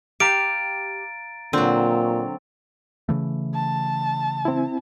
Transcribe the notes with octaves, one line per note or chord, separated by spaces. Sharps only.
G4 F5 A#5 A6 D7
A#2 D3 F#3 C4
C#3 E3 A3
A5
C4 E4